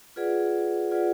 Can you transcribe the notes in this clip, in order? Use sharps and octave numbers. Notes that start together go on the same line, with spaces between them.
F4 G#4 B4 D5 F#5
F4 G#4 B4 D5 F#5